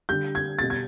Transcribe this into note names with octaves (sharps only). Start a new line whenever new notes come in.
D3 G3 G6
G#6
B2 G3 A6
G#6